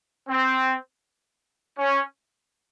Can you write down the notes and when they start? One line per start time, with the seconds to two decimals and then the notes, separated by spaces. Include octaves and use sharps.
0.29 C4
1.78 C#4